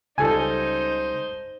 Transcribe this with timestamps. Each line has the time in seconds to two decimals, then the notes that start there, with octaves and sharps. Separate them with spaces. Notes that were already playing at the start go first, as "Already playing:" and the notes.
0.18 C#2 G3 D#4 A4 C5 G#5